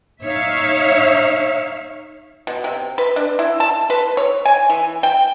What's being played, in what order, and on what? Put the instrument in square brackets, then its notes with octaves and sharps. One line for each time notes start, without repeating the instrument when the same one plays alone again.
[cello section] D#4 C#5 E5 F5
[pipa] B2
C3
B4
D4
E4
A5
B4
C#5
G#5
E3
G5